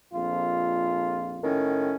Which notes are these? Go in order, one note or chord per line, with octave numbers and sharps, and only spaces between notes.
A#1 F2 F4
A2 D#3 C#4